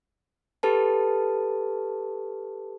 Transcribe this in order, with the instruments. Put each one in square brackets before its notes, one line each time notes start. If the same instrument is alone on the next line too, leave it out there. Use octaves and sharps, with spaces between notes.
[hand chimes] G4 A4 B4 A5